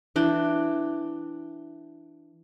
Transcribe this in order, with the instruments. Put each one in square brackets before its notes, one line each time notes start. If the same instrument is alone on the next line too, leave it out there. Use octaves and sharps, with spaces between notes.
[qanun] E3 D4 G5